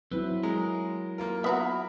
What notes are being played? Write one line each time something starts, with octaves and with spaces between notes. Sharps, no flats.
F#3 C4 E4 B4
G#3 A#4
A#3 F4 A#4
B3 F#4 E5 A#5 B5